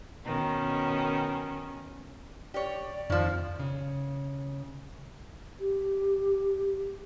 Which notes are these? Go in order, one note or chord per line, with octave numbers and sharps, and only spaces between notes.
B2 D#3 C#4
G4 C#5 D5
F2 D#3 F3
C#3
G4